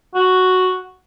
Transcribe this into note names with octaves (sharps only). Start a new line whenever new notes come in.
F#4